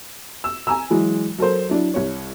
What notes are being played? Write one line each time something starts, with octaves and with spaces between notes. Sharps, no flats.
E6
G#5 A#5 E6
E3 F#3 G#3 E4
F#3 A4 A#4 C5
F#3 D4 E4
C2 C#5